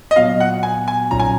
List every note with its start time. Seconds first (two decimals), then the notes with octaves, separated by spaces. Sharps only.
0.11 D#5
0.16 A#2 F#3 B3 F#4 F5
0.40 F#5
0.63 G#5
0.88 G#5
1.11 B1 A#2 F#3 C#4 F4 A#5
1.20 G#5